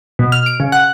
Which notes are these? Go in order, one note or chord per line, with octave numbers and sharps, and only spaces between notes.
B2
F6
D7
C#3
F#5